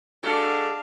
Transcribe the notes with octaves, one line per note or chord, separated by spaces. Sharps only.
G#3 D4 F#4 A4 F5